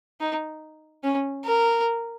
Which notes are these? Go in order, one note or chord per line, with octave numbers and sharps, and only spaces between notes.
D#4
C#4
A#4